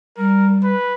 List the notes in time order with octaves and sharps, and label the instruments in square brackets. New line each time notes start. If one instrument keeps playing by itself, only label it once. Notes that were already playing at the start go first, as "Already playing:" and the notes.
[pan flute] G3 [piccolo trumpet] A#4
[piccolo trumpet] B4